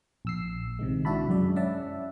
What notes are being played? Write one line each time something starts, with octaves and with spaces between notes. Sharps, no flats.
A#1 E6 C7
C3 D#3 G#3
D4 E4 F#4 E5 A5 B5
F#2 G#3 D5
C#4 D5 E5 F#5 A5